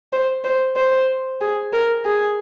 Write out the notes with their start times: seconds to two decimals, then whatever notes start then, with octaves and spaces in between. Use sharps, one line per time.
0.13 C5
0.44 C5
0.77 C5
1.41 G#4
1.73 A#4
2.05 G#4